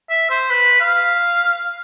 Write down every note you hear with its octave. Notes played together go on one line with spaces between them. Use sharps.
E5
C5
B4
F5